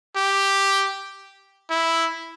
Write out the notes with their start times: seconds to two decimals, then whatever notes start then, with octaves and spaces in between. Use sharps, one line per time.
0.16 G4
1.70 E4